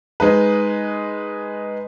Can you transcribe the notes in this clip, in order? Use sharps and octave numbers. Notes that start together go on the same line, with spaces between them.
G#3 D#4 B4